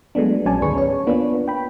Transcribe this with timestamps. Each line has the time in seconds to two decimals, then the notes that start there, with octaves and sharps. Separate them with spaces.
0.15 F#3 G#3 A3 B3 D4
0.46 A#1 F#3 C#4 D5 G#5 A5
0.61 D2 G#2 D#3 G#4 B4 C#6
0.74 C#4 C#5
1.07 A#3 B3 D4 F4 B4
1.48 G5 B5